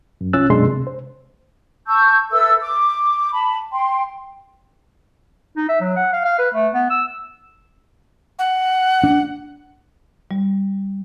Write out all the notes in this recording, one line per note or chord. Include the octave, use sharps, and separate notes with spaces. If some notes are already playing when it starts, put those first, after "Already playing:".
F#2
C2 C#4 F4 E6 F#6 A6
C#2 F#2 B2 G#3 D4 C6
C3
C5
A5 C#6 E6 G6
A4 B4 E5 E6
D6
A5 B5
G5 C6
D#4
E5
F#3
F#5
F5
F5
B4
A3
B3
E6
F#5
D4
G3